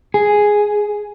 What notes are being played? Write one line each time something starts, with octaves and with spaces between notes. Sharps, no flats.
G#4